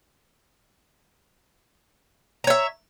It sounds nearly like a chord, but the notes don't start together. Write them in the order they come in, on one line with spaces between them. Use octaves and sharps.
A#5 C#5 E5